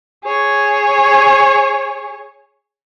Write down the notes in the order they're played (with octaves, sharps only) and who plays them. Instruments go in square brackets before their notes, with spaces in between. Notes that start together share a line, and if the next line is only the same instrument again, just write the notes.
[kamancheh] G#4 C#5